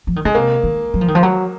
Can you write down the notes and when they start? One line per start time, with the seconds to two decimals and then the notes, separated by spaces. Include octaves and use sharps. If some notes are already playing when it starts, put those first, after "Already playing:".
0.07 F3
0.16 D#3
0.25 C#3 G#3
0.35 C3 A#3
0.63 D#3
0.94 F#3
1.01 F3
1.08 D#3
1.15 F3
1.23 F#3